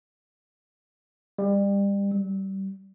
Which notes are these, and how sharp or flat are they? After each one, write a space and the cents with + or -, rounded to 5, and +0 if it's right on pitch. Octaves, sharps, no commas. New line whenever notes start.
G3 +30
G3 -25